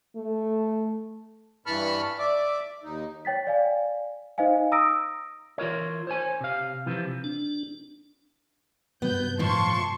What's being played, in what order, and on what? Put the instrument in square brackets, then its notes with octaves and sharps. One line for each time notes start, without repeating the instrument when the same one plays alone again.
[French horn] A3
[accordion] G2 E3 A5 B5 C#6 F6
D5 E5 D6
D#2 D#4
[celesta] C#5 G5 A6 B6
D5 F5 G#5
D#4 C5 D#5 F5 G#5
A#5 D#6 E6 A#6 D7
[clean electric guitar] E3 F4 A#4 C#5
C5 C#5 G#5
C3 F5
C3 E3 F3
[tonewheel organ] D4
[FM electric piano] G2 C3 F#3 [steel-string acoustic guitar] B3 [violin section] G6
[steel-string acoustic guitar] A2 F3 [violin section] A5 C6 C#6